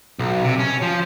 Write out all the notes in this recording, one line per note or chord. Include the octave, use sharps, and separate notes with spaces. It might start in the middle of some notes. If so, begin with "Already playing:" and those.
B1
C3
C#4
F3